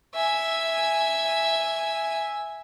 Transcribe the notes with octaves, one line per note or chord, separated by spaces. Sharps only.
E5 G#5